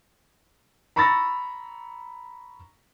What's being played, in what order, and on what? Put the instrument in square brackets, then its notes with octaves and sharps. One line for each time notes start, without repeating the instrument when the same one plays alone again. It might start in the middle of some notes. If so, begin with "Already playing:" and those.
[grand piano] A#5 B5 C#6 E6 A6 A#6